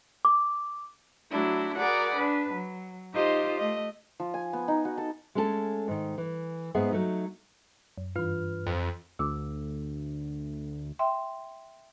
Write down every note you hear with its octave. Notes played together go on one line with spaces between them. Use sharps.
D6
F#3 A3 D4 E4
F#4 G#4 A#4 D5 F#5 B5
D4 B4
F#3
D#4 F4 G4 C5 D#5
A3 D#5
F3
G#5
B3
D#4
F#4
A4
G#3 A3 C#4 F#4 A4
G#2 D#3
E3
G#2 B3 G#4 E5 F#5
F#3 A3 D#4
F#2
G2 E3 F4 B4 F6
F2
D2 D6 E6
E5 G5 C6